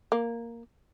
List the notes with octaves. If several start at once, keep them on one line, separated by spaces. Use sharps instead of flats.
A#3